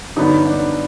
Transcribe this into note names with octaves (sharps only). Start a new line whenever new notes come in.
G2 D3 F#3 B3 D#4
D4